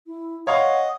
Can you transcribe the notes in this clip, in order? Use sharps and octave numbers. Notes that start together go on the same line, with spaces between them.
E4
C#5 D#5 F5 F#5 C6